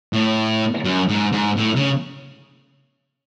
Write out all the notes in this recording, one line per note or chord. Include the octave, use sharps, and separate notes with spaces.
A2
F#2
G#2
G#2
A2
C#3